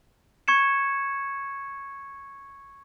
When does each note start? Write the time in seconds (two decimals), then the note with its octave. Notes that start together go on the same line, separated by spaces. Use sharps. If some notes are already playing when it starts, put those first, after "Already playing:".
0.48 C#6 G#6 C#7 E7